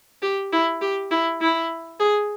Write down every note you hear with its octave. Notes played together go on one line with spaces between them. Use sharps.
G4
E4
G4
E4
E4
G#4